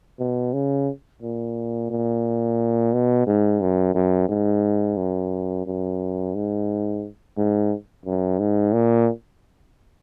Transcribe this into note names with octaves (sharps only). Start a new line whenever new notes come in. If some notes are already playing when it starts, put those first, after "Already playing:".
B2
C#3
A#2
A#2
B2
G#2
F#2
F#2
G#2
F#2
F#2
G#2
G#2
F#2
G#2
A#2